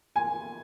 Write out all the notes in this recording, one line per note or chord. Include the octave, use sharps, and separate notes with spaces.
G#5